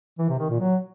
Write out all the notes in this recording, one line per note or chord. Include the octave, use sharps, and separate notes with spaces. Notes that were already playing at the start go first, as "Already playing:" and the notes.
E3
C3
D#3
A#2
F#3